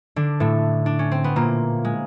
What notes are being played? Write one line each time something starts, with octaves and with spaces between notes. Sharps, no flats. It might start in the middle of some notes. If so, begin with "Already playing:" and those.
D3 D4
A2 A3
D4
C#4
C4
B3
A#2 A#3
G#3